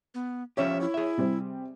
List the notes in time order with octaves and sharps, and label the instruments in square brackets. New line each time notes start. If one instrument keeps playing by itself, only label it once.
[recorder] B3
[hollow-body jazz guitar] F3 C#4 G4 [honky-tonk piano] C#5 [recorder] E5
[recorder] E4
[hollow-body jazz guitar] G#4 E5
[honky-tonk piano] C3 G3 C4